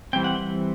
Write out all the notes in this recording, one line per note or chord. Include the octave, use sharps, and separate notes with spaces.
E3 G3 C4 G5
F#5